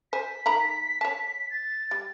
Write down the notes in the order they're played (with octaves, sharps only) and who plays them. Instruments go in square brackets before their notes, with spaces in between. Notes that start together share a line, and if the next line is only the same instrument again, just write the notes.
[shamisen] C5 G#5 [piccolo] B6
[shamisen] D#3 A#5 B5
C#5 A5
[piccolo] A6
[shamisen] G3